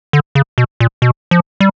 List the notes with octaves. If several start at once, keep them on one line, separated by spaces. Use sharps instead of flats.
D3
C#3
B2
A#2
B2
F3
G3